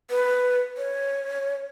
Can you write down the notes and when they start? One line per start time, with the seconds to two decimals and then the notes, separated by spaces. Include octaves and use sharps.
0.10 B4
0.77 C#5